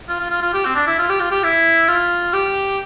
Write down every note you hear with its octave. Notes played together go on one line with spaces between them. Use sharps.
F4
F4
F4
F4
G4
C4
D4
E4
F4
G4
F4
G4
E4
F4
G4